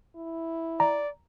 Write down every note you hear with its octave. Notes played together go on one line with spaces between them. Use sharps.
E4
D5 A#5